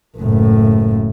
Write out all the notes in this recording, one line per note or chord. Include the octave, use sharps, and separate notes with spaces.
F#1 A2